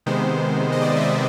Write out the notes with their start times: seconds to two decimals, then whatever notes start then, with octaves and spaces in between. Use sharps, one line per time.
0.06 C3 D#3 G#3 B3 C5
0.72 D#5
0.82 D5
0.96 E5
1.00 D#5